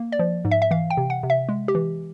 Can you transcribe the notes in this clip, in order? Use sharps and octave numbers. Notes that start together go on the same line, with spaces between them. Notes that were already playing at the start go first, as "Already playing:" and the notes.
Already playing: A#3
D5
F3
G#2
E5
E5
E3 F5
G5
C3
F#5
C3
E5
G#3
G4
E3